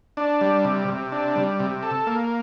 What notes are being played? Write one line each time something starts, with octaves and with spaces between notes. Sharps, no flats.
D4
G3
C3
C3
D4
G3
C3
A4
A#3